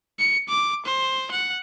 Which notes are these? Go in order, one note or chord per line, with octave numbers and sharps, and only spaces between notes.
C#7
D6
C5
F#5